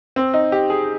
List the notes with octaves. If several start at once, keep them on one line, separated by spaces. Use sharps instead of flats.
C4
D#4
G4
G#4